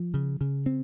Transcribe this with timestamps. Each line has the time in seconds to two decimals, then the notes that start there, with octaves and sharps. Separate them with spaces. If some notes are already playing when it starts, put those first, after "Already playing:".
Already playing: F3
0.14 C#3
0.41 C#3
0.66 C4